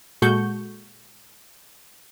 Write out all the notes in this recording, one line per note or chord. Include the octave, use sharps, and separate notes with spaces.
A#2 G#3 F#4 A4 C#6 G6